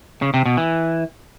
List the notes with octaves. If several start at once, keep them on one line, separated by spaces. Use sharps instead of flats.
C#3
C3
B2
E3